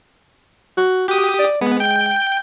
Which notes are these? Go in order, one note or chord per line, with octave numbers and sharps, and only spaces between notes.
F#4
F#4 G4 D#6
D5
G#3 B3
G5 G6